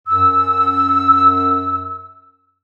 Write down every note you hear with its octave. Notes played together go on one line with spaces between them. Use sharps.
F#2 E6